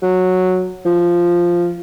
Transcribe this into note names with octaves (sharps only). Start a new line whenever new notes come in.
F#3
F3